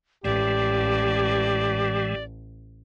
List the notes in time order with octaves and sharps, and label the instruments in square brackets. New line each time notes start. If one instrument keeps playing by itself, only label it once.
[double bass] A1 [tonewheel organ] A2 E3 G#3 [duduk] G4 [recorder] D5